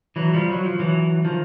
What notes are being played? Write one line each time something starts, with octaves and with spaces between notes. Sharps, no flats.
E3 F#3
F3 G3
F#3
F3
E3 F#3
D#3 F3